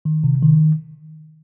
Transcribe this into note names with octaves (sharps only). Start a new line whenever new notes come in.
D#3
C3
D#3